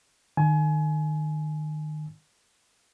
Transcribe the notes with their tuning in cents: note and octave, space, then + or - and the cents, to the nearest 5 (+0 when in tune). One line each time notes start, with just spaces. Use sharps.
D#3 -30 G#5 +30